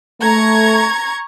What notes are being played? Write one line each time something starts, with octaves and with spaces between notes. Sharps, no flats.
A3 A#5 C#6 G#6